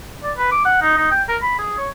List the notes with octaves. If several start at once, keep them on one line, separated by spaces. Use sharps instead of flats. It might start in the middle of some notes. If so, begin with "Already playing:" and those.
D5
B4
D6
F#5
D#4
D#4
G5
A#4
B5
G#4
C#5